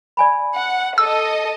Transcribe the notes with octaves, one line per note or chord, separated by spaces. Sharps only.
D5 G#5 B5
F#5
A4 D#5 E6